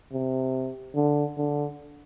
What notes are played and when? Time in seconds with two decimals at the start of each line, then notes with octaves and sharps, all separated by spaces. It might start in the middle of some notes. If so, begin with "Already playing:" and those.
0.13 C3
0.95 D3
1.37 D3